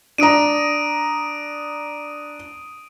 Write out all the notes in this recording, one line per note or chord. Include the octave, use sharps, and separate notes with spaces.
D4 A#5 D#6 D7 D#7